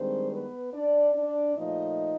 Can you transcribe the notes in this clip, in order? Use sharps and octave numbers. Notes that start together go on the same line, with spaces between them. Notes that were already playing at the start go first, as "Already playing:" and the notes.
Already playing: G2 D#3 G#3 C4 C5
B3 B4
D4 D5
D4 D5
A#2 F3 A3 D#4 D#5